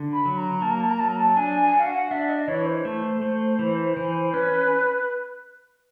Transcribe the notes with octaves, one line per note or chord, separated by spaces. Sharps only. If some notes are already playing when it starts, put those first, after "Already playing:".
Already playing: D3
B5
F#3
A#5
A#3 A5
A#5
A5
A#5
F#3 A5
A#5
A5
D4 G#5
G#5
F#4
F5
F#5
D4 E5
D#5
E3 C#5
C5
A3
A3
E3
E3
C#4 B4